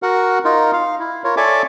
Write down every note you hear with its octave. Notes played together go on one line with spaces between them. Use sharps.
F#4 A#4 F#5
D#4 F4 A#4
F5
E4
F4 A#4 C#5
A4 C#5 D5 E5 G#5 D6